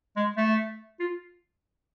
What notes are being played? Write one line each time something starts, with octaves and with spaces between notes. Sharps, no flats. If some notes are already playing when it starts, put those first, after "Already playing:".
G#3
A3
F4